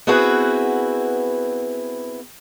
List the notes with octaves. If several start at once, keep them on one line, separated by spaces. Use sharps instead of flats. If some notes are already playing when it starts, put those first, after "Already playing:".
B3 C4 E4 F#4 G#4 B4